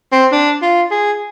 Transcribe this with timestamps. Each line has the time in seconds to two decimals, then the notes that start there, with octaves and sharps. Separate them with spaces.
0.12 C4
0.32 D4
0.62 F4
0.91 G#4